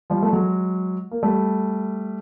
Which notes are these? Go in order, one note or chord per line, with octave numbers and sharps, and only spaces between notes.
F3 G3
A3
F#3 G#3
A#3
G3 A3